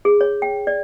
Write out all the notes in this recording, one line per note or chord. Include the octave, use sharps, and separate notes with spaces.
G#4
C#5
G5
D5